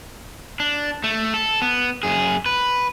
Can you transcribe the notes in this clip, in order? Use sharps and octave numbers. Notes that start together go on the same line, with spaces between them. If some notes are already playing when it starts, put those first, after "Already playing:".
D4
A3
A4
B3
F#2 G#4
B4